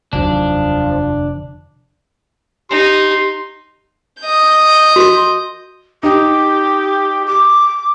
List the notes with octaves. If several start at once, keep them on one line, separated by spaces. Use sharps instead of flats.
F1 D#2 B2 D3 D#3 F3 F#3 D4
D#4 G4 C6
D#5 G6
F#4 C6
D#4 G4
D6